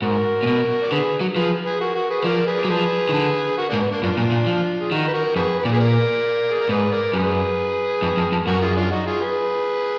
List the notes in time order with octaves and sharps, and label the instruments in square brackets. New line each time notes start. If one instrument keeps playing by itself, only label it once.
[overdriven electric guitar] G#2 [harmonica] F#4 A#4
[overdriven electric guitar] A#2
B2
[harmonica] D5
[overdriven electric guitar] D3 [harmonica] G#4 B4
[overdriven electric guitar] F#3
[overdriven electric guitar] F3 [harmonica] G#4 B4
[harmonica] G#4 B4
F#4 A#4
F#4 A#4
G#4 B4
B4
[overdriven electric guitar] F3 [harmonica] A#4 D5
[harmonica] G#4 B4
D5
[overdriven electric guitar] F#3
[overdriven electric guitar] F3 [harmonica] G#4 B4
[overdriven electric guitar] D#3
D3
[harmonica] F#4 A#4
[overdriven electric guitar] G#2 [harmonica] A#3 D4
[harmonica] B3
A#3 D4
[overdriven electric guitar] F#2 [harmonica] D4 F4
[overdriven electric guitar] A#2
A#2
F3
[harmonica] G#4
[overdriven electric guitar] D#3 [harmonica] D#4 F#4
[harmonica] B4
F#4 A#4
[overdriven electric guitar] F2 [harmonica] G#4 B4
[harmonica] B4
[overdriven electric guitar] A#2 [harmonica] D5
[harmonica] G#4 B4
A#4 D5
G#4
A#4
[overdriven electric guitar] G#2 [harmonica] G#4 B4
[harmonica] A#4 D5
[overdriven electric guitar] F#2 [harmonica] G#4 B4
[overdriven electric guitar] F2
F2
F2
[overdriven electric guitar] F#2 [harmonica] F#4 A#4
[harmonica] F4 G#4
D4 F4
D#4 F#4
F4 G#4
G#4 B4